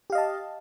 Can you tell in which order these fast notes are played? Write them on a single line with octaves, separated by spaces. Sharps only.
G4 F5 D#5 A5